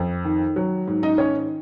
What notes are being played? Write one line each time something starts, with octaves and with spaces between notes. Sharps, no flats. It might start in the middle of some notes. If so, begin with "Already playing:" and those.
Already playing: F2
D#3
F#3
G#2
D#4 D#5
D#3 C#4 C#5